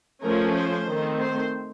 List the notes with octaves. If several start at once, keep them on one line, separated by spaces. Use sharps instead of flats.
F3 A3 C#4 A#4
C5
D#3 A3 C4
C5